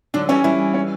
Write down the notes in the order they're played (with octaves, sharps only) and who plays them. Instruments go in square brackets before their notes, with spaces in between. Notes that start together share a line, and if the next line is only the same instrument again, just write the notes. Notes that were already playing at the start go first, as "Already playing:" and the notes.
[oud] D3 F#3 [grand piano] D4
[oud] E3 G3 [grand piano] C#4
[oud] E3 G3 [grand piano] E4
[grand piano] C#4